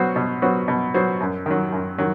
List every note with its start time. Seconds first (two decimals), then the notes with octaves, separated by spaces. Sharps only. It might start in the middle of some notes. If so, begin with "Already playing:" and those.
Already playing: B2 F#3 B3 F#4 C5
0.16 B2
0.42 F#3 B3 F#4 C5
0.68 B2
0.94 F#3 B3 F#4 C5
1.21 F#2
1.46 D#3 F#3
1.72 F#2
1.98 D#3 F#3